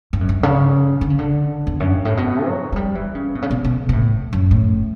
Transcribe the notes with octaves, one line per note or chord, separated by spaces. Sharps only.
G2
F#2
G2
C#3
D3
C#3
D3
E2
F#2
G2
A2
B2
F#3
F#3
G3
E3
C#3
B2
C#3
B2
B2
B2
A2
F#2
A2